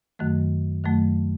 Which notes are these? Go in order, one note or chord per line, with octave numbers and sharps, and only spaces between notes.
F#2 D#3 F#3 A3
F#2 D#3 F#3 A3